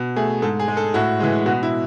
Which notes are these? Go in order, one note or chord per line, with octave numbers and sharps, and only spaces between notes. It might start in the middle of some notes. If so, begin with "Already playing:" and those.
Already playing: B2
A3 G#4
G#2 A4
G#4
G#3
A4
A2 F#4
E3 G#3
B2 F#4
E4